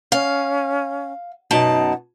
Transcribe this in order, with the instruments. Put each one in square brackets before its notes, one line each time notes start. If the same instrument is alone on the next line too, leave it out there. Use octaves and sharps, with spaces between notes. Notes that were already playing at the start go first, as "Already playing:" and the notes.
[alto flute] C#4 [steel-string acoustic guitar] F5
[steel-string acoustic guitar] F#2 B2 A5 [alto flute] D#4